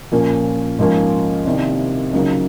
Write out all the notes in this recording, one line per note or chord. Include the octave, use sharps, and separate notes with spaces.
A#2 F3 A#3 C#4
G#2 F3 A#3 C#4
C2 C3 D#3 A#3
C#2 C#3 F#3 A#3 D#4